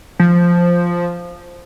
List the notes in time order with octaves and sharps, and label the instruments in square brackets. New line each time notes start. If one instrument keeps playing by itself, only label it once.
[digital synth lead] F3